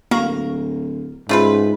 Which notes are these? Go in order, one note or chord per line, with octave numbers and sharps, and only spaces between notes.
D1 A#3 F#4 A#4
G#2 C#3 A3 F4 B4